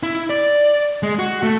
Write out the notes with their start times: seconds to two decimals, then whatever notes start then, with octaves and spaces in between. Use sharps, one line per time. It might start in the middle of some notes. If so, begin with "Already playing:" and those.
0.03 E4
0.30 D5
1.03 G#3
1.19 F#4
1.43 A3